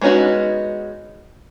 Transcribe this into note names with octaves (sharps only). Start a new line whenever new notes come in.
G#3 B3 C#4 D#4 F#4